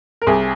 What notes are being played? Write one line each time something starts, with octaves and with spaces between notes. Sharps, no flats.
A#4
C2 G#4